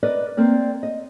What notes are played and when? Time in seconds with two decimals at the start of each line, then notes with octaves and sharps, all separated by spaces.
0.03 A#4 B4 D5 D#5
0.37 A#3 C4 A#4 D5
0.83 D#5